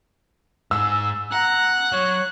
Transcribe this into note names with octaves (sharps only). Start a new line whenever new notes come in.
G#2 E6
F#5 A#5 F#6
F#3 C#5